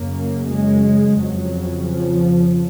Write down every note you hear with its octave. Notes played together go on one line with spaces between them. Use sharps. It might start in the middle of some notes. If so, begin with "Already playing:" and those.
Already playing: F#2 C#3 A#3
G#3
F2 C#3 F#3
F3